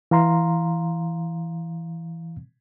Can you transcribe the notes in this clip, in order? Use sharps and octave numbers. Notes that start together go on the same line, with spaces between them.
E3 F5 A#5 C6